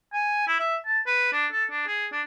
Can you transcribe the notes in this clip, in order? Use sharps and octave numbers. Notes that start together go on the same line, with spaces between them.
G#5
E4
E5
A5
B4
D4
A4
D4
G#4
D4